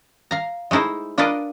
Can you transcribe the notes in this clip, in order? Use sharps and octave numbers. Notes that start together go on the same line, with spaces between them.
F5 A#5
G#3 A3 D#4 E4 C5
D4 F4 A#4 B4 D5 D#5